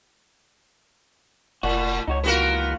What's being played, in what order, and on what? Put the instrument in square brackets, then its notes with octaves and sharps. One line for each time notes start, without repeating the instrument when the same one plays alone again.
[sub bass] F1 [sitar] A2 [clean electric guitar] F#4
[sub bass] C#2 [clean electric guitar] D#4 F#4 C#5
[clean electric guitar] D#2 E3 F4 [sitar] B3 F#4 A#4